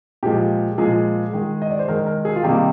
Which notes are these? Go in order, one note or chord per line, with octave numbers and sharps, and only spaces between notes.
A#2 F3 G#3 G4
A#2 F3 G#3 G#4
D#3 G#3
D#5
D5
C5
D#3 G#3 A#4
A#4
G#4
F4
C3 D#3 G3 A#3 G4